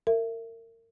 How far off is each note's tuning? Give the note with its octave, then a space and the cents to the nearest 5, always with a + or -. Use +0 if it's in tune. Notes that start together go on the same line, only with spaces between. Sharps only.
A#4 -35 E5 +15